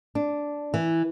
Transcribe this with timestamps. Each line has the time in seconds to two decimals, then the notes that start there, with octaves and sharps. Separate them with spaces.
0.15 D4
0.74 E3